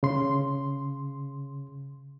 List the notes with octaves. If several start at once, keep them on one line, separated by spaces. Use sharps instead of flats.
C#3 C6